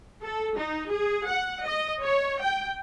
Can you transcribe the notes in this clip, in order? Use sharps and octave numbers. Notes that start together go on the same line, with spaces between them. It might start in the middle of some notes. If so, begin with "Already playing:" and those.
A4
D#4
G#4
F#5
D#5
C#5
G5